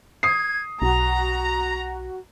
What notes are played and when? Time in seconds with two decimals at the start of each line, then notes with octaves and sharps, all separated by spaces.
0.23 D#6 G#6 C7
0.82 B1 F#4 A#5